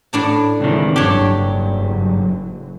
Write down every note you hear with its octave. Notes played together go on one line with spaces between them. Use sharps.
A2 D4 A5
C#2 C3 D#3 E3
F#1 G2 F#3 D4 G4 C#5